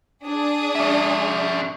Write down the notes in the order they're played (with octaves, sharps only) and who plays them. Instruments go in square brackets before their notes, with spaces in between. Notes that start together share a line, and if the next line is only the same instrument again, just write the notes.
[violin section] D4 G#4 D#6
[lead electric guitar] C#4 E5